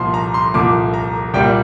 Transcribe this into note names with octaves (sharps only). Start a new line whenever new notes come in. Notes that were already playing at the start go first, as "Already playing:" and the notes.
Already playing: C2 A#2 F3 C6
A#5
C6
C2 A#2 F3 D6
A#5
C2 A#2 G3 G5